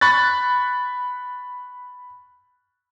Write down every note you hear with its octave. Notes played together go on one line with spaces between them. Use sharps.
B5 C#6 F#6 A6